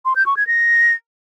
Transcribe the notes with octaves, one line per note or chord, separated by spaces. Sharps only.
C6
G6
C#6
G#6
A#6